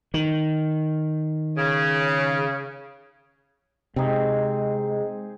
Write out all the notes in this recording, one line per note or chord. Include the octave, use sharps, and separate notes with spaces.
D#3
C#3
C3 G#3 C4 D#4 G#4